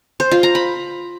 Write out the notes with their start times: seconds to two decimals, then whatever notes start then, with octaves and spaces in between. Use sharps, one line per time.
0.20 C5
0.31 F4
0.43 A#5
0.55 B5